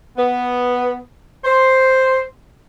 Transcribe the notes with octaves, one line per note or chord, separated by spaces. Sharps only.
B3
C5